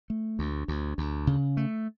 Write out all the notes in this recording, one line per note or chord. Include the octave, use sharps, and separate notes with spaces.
A3
D2
D2
D2
C#3
A3